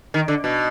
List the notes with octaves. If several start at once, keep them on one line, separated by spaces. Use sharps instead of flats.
D#3
D3
B2